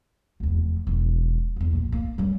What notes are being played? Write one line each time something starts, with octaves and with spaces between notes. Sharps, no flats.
F1 E2
E1 F3
E2 D#3
A#1
A#3
G3 C#4